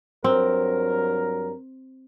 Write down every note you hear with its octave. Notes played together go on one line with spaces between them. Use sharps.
G2 F#3 C4 A#4